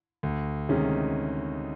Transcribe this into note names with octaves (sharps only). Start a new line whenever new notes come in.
D2
C3 D#3 G#3 C#4